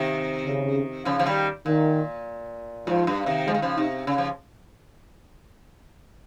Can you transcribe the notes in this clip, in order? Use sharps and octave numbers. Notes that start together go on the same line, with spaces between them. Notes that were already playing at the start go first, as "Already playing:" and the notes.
Already playing: C3 D#3
C#3
C#3 F3
F3
D#3 G3
A#2 D#3
G#2 F3
G2
C3 D#3
F3 G#3
D#3
C#3 F3
C3 D#4
C#3
F3